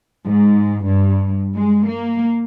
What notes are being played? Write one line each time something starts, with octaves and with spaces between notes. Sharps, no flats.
G#2
G2
G#3
A#3